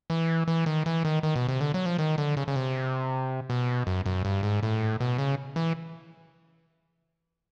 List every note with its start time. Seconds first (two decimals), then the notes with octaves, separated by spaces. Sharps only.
0.10 E3
0.48 E3
0.66 D#3
0.86 E3
1.05 D#3
1.23 D#3
1.36 B2
1.49 C3
1.61 D3
1.74 F#3
1.86 F3
1.99 D#3
2.18 D3
2.37 C#3
2.48 C#3
2.56 C3
3.50 B2
3.87 F#2
4.06 F#2
4.25 G2
4.43 G#2
4.63 A2
5.00 B2
5.18 C#3
5.56 E3